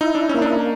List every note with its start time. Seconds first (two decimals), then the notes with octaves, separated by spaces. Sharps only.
0.01 D#4 E4
0.15 D4
0.29 A#3 C#4
0.42 D4